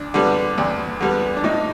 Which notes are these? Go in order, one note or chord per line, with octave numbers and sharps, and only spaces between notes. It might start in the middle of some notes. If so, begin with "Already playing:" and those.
Already playing: D2 D4
D3 G3 B3
D2
D3 G3 B3
D4
A2 D#4